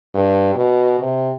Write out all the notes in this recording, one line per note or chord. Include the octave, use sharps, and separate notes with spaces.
G2
B2
C3